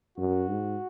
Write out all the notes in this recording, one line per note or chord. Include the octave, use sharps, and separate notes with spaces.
F#2 F#4
G#2